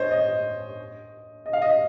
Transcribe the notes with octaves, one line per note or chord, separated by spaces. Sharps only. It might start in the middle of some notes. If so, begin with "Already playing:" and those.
Already playing: C5 C#5 D#5
D#5
D#5
F5
D#5